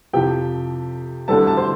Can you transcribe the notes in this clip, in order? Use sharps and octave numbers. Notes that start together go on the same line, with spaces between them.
F2 C3 F3 G4 G5
D2 D3 G3 A4 A5
A5
C5 C6